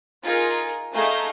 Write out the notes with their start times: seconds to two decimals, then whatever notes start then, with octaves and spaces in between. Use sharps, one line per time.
0.24 D#4 F4 G#4 A#4
0.94 A3 D#4 G#4 F5 A#5 G6